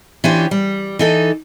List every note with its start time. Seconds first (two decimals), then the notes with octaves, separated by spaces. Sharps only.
0.24 E3 C#4 D4 F4 G4 C5
0.51 G3
0.99 E3 D#4 A4